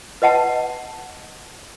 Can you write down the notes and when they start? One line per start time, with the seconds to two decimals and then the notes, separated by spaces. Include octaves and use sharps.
0.22 B4 D#5 F#5 A5